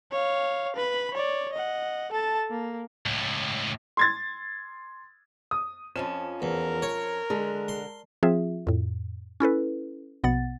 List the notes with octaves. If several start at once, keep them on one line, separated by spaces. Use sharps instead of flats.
C#5 F5
B4 B5
C#5 D5
D#5 F#5
A4 A5
A#3
C#2 A2
C6 G#6 A6
D#6
F2 F3 C#4 E7
E2 A#4
C#5
D3 G#3
C6
F3 C4 F4 G#4 E5
F2 A2
C#4 E4 A4 B4
A#1 B2 B3 F#5 A6